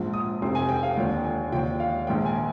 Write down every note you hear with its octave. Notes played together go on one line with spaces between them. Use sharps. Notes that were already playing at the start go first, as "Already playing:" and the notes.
Already playing: A#1 G#2 F3
D#6
F1 F2 C3 C6
G#5
G5
F5
D#2 D3 F3 G5
G#5
D#2 D3 F3 G5
F5
A#1 G#2 D#3 G5
G#5